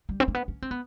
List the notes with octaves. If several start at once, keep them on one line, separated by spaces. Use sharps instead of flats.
G3
C4
A#3
B3
C#4
C4
B3